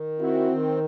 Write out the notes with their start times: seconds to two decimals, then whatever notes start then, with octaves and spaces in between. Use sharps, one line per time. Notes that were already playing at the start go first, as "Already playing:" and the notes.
Already playing: D#3
0.20 C4 E4 F#4
0.51 D#3